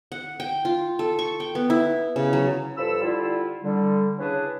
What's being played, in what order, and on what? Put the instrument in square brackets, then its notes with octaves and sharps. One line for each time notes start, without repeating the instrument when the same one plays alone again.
[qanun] F#5
G5
F4
A4
C#6
G5
B3
E4
C#3
F#3
[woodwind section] G2 F3 A4 B5 E6
D3 G3 E4 F4
D3 G3
C#3 C#4 D4 E4 G#4 B4